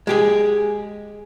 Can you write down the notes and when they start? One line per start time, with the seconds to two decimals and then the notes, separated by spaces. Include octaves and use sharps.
0.07 G#3 G4 G#4